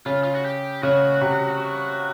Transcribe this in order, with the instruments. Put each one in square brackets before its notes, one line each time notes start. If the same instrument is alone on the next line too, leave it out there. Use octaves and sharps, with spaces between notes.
[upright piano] C#3 [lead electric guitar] F4
[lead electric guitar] F4
F#4
G4
[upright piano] C#3 [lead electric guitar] F#4
[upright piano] C3